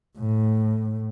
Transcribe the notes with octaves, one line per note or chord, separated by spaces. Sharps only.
A2